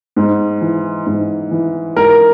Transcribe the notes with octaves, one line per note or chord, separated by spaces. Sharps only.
G#2
E3
G#2
E3
G#2 A#4